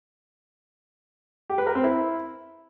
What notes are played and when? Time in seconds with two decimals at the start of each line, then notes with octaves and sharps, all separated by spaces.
1.50 G4
1.58 B4
1.67 A#4
1.75 C4
1.84 E4